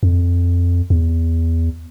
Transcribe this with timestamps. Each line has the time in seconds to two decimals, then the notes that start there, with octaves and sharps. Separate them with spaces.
0.03 F2
0.90 E2